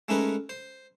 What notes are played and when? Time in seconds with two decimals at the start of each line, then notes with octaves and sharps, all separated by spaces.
0.08 G#3 A3 C#4 D#4 A#4 B4
0.49 C5